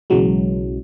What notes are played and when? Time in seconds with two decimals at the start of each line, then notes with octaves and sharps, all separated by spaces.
0.10 B1 C#3 E3 F#3 G#3